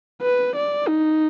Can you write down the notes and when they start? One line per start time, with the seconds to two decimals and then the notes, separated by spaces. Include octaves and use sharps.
0.22 B4
0.55 D5
0.89 D#4